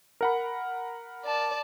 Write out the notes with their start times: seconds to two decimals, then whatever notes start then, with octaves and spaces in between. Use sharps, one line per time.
0.21 A#4 F#5 B5
1.23 D5 A5